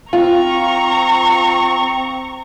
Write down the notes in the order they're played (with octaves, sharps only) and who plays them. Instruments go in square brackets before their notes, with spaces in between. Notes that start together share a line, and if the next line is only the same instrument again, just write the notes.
[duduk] C4 [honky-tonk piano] F4 [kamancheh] A#5 C#6